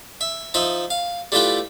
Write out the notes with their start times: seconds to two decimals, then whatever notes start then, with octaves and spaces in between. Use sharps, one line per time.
0.21 E5
0.54 F3 D#4 D#5 E5
0.90 F5
1.32 G3 A3 E4 F4 B4 G5